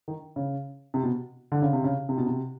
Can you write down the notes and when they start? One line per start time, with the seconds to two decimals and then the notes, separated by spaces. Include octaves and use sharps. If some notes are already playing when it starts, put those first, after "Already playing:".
0.08 D#3
0.36 C#3
0.94 C3
1.03 B2
1.52 D3
1.62 C#3
1.73 C3
1.84 C#3
2.09 C3
2.18 B2
2.27 C3